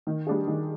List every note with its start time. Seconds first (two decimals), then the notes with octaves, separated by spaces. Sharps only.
0.07 D#3
0.27 G3 D4 G#4
0.47 D#3